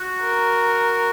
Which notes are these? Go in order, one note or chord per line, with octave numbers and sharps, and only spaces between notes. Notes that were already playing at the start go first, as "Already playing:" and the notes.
Already playing: F#4
A#4